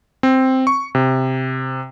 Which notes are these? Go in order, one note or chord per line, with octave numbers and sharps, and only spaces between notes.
C4
C#6
C3